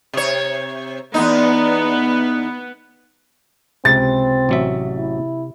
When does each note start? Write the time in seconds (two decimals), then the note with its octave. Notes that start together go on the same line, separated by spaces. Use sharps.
0.13 C3 C#5
1.14 E2 B3 D#4
3.85 C#2 C3 C4 A6
4.49 A1 F#3 E5
4.99 E4